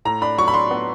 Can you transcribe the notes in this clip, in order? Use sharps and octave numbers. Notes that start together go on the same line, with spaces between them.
A2 A#5
D4 B5
F#3 C#6
B5
D4 C6
B3